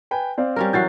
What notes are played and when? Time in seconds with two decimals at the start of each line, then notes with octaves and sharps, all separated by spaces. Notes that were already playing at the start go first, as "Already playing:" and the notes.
0.11 B4 G5 G#5
0.38 C4 D5 F5
0.56 G3 C#4 A#4
0.73 E3 F#3 F#4 G6 A6 C7